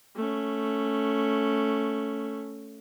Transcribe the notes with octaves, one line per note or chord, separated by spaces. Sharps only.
A3 C#4